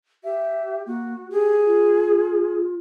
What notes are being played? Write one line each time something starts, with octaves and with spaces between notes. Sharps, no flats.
G4 E5
A#3 F#4
G4 G#4
F4